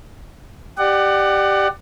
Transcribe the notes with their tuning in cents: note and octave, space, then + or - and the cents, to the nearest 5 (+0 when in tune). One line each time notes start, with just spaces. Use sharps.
G4 +0 D5 +25 F#5 +15